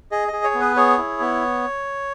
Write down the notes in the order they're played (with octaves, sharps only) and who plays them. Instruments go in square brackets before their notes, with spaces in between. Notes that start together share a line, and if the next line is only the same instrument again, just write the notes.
[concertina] G#4 D#5
G#4 D#5
C#5
B3
B4
G#4 C#5
E4
B3